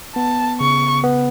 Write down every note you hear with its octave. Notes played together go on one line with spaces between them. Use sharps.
B3 A5
C#3 C#6
B3